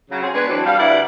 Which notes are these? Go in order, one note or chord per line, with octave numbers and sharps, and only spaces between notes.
C#3 F#3
C4 C#4 G#4
G#3 B3 D4 B4
E3 F#3 C4 D4
G3 F5
D2 G2 E4 D5 F#5